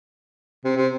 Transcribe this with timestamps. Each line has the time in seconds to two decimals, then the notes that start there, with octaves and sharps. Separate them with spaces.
0.65 C3
0.76 C3